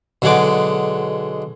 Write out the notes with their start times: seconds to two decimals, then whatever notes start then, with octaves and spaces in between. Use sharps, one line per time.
0.22 B1 D3 G#3 G#4 F#5 D6